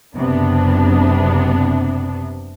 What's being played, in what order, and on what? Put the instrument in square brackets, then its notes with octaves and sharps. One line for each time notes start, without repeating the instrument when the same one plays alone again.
[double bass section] F#1 [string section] C3 B3 D4